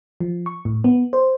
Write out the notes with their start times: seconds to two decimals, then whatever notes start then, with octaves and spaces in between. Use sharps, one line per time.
0.20 F3
0.46 C#6
0.65 A2
0.84 B3
1.13 C5